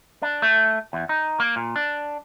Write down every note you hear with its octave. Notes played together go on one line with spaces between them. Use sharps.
D4
A3
E2
D#4
A#3
A#2
D4